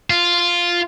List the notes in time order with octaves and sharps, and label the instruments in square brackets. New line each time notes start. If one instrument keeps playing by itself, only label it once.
[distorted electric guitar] F4